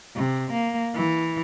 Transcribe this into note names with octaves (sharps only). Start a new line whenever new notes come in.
C3
A#3
E3